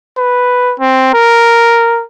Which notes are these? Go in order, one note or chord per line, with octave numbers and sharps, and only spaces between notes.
B4
C4
A#4